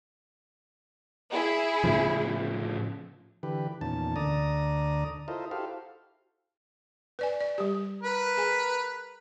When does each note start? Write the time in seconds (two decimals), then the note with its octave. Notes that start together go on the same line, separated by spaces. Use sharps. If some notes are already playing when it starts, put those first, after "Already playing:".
1.32 E4 G#4
1.84 A2 C#3 F3
3.43 D3 E3 G4 B4
3.81 E2 A#2 D#3 C#4 A5
4.16 D2 D3 D5 A#5 D#6
5.28 E4 F4 A4 A#4 C5 D#5
5.51 E4 F#4 G4 A4 C5 F5
7.19 B4 D5 G#5
7.40 D5
7.58 G3 G4
8.03 A#4 B4
8.37 G#4 G#5